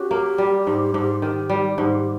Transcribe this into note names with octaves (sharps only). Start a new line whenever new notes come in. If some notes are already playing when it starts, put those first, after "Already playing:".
Already playing: C#4 F#4 G4
A#3
G3
G#2
G#2
D#3 G4
G3
G#2